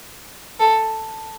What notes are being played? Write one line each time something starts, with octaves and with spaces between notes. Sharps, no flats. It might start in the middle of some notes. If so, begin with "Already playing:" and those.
A4